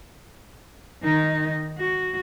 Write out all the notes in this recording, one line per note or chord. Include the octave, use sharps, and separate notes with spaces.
D#3 D#4
F#4